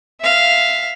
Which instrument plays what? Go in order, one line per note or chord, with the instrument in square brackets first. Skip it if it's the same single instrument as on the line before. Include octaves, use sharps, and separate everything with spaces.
[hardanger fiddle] E5 F5